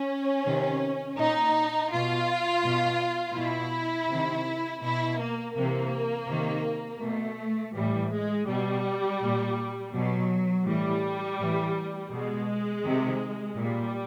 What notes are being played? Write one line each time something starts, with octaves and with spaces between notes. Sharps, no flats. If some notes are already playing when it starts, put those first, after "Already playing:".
Already playing: C#4
C3 D#3
A#2 D#4
B2 F4
B2
B2 E4
C3 D#3
B2 E4
A#3
C3 E3 A#3
C3 D#3
B2 A3
A2 E3 G3
G#3
B2 G3
A#2
B2 F#3
A2 E3 G3
A2 E3
B2 G#3
C3 D#3
A#2 G3